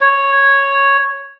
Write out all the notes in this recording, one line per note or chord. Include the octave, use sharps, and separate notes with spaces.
C#5